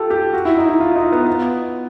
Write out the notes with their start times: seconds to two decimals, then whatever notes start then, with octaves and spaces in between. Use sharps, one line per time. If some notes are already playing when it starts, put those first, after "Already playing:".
Already playing: F4 G4 A4
0.10 G4
0.33 F#4
0.45 E4
0.57 D#4
0.69 E4
0.80 F4
0.96 D#4
1.12 B3
1.27 B3